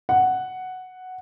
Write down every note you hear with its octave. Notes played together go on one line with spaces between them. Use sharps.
F#5